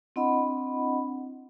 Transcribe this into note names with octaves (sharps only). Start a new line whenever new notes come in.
C4 D4 E4 D#5 F#5 B5